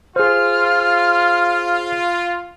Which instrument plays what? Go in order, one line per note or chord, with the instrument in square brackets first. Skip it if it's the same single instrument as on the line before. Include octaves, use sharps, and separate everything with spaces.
[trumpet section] F4 [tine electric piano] G#4 C5 [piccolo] F6